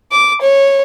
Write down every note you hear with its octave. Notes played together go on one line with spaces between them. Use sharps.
D6
C#5